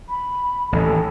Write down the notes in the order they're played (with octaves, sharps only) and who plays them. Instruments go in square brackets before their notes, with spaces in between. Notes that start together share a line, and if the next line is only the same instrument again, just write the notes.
[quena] B5
[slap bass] A1 D#2 [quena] A4